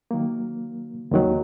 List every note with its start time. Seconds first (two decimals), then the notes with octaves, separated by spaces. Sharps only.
0.11 D#3 F#3 A#3
1.11 D#2 D#3 F#3